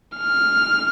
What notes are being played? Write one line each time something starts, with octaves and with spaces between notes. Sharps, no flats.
F6